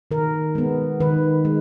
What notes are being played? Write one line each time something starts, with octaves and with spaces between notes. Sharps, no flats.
D#3 A#4
G#3 B3
D#3 B4
G#3